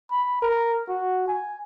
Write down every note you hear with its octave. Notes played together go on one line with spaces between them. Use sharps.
B5
A#4
F#4
G#5